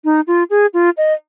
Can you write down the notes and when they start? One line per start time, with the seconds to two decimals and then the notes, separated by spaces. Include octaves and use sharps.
0.04 D#4
0.27 F4
0.50 G#4
0.74 F4
0.97 D#5